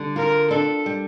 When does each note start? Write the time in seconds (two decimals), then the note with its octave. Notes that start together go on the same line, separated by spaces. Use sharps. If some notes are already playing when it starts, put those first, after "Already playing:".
Already playing: D3 G3
0.16 F4 A#4
0.50 D4 A4
0.86 G3